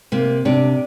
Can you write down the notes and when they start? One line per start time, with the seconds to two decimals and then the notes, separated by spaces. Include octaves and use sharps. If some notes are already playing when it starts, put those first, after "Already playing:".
0.12 C3 A#3
0.45 C3 D4